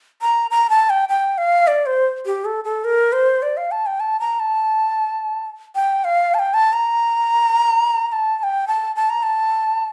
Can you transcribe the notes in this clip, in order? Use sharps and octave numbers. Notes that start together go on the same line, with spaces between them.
A#5
A#5
A5
G5
G5
F5
D5
C5
G4
A4
A4
A#4
C5
D5
F5
A5
G5
A5
A#5
A5
G5
F5
A5
G5
A5
A#5
A#5
A5
A5
G5
A5
A5
A#5
A5